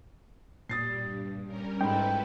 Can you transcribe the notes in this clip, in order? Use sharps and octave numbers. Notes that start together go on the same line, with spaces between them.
A#2 G3 D#6 A6 C7
G2
G3 C#4 A#4
G#2 E4 A4 B4 G5 B5